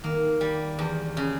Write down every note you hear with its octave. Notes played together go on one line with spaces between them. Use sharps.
D#3 A#3
G3
E2
C#3